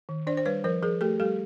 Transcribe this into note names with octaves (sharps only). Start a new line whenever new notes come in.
D#3
D4 C5 D5
C5
G3 B4 C#5
F3 A#4 C5
F3 G#4 A#4
A3 G4 A4
G3 G4 A4